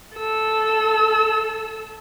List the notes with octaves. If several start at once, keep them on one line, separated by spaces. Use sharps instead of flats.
A4 E6